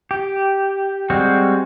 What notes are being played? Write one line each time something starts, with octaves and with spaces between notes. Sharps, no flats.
G4
G3 G#3 C4 F#4